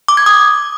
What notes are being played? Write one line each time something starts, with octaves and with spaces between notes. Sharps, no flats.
D6
G#6
D#6